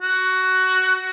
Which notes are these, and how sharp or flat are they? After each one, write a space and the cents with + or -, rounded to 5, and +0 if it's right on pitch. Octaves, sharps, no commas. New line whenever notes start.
F#4 +15